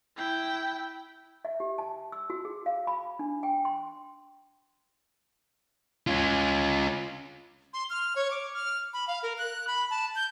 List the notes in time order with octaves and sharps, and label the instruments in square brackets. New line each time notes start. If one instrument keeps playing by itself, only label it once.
[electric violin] E4 G5
[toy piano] E5
G4
A5
E6
F#4
G#4
F5
B5
D4
G5
C6
[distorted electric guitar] C#4 F4
[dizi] C6
F6
C#5
D6
F6
B5
F5
A#4
F#6
B5
A5
G6